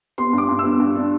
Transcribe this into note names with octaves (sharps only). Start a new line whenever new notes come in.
B3 C6
G2
D6
G2
E6
B3
G2
D4